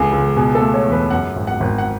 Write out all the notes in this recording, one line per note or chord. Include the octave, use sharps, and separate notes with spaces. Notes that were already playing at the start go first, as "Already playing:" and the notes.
Already playing: C#2 C#3 G#4 A4
C#2
B2 G#4
A4
A3
C#5
E2
B4
F#2 F#5
G#1
F#5
G#1
F#5